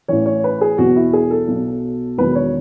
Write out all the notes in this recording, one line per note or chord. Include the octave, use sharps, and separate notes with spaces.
A1 A2 E3 C#5
C#5
B4
G#4
E2 B2 F#3 F#4
E4
G#4
A4
B1 B2 F#3
E1 E2 D#3 F#3 B4
C#5